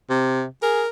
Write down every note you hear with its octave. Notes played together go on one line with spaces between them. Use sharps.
C3
G#4 A#4